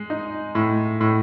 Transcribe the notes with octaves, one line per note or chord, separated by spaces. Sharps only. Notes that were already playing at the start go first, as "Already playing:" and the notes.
Already playing: G#3
D#4
A2
A2